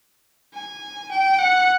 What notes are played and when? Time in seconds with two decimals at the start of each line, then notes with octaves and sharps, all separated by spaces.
0.54 G#5
1.11 G5
1.39 F#5